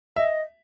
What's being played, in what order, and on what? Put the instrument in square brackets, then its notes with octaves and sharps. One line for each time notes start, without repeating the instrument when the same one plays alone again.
[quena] D#5 [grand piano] E5